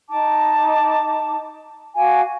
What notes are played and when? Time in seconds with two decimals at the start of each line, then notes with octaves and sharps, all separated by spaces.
0.09 D#4 A5 D6
1.96 F#4 F5 G#5 D6